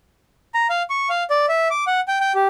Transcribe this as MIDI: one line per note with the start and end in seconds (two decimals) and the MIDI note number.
0.54 0.67 82
0.70 0.83 77
0.90 1.09 85
1.09 1.24 77
1.30 1.46 74
1.49 1.68 76
1.71 1.84 86
1.87 2.00 78
2.08 2.18 79
2.20 2.32 79
2.35 2.48 67